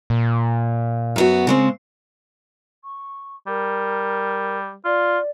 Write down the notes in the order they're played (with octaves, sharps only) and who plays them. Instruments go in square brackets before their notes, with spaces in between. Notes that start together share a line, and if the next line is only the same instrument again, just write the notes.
[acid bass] A#2
[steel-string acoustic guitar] F#2 B3 F#4
C#3 G#3 C4
[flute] C#6
[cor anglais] G3 [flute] A#4
[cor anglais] F4 [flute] D5